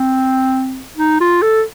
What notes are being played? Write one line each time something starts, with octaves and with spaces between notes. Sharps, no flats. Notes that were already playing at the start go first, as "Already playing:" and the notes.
Already playing: C4
D#4
F4
A4